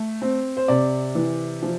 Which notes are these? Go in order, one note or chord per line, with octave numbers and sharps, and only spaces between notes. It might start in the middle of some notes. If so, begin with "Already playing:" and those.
Already playing: A3
C4
C5
C3 D5
E3
F3